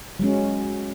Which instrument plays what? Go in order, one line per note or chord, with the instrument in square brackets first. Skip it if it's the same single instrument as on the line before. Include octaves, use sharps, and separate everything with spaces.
[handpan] F#3 G#3 C#4